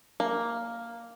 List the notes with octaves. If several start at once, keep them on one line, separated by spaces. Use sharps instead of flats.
A#3